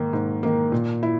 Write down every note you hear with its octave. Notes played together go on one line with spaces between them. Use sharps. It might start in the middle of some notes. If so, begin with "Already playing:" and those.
Already playing: G#2 D#3 A#3
G#2
D#3 A#3
A#2
E4